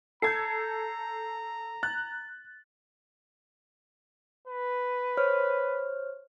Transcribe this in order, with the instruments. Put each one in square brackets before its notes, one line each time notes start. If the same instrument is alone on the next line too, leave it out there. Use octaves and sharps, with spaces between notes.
[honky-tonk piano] A4 G#6 [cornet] A#5 [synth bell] G6 C7
[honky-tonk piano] F#6 [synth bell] A6
[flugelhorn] B4
[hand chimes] C5 C#5 F6